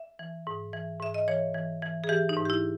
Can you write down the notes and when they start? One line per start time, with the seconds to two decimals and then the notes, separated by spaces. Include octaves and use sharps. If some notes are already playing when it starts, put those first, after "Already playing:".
Already playing: E5
0.19 E3
0.47 G#2
0.73 E3
1.00 G#2 E5
1.14 D#5
1.28 E3 C#5
1.54 E3
1.82 E3
2.04 G#4
2.09 E3 G4
2.29 D#4
2.37 G#2
2.45 G4
2.50 E4